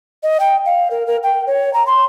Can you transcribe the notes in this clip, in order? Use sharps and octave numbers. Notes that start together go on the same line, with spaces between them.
D#5
G5
F5
A#4
A#4
G5
C#5
A#5
C6